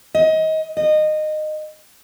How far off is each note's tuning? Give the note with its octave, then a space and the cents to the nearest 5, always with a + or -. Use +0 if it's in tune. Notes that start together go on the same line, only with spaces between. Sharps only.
D#5 +25
D#5 -20